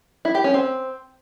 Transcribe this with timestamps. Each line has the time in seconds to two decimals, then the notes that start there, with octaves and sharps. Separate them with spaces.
0.25 E4
0.35 G4
0.44 C#4
0.54 C4